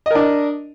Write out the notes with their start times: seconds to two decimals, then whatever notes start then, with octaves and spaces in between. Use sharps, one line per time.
0.06 D#5
0.11 A#4
0.15 D4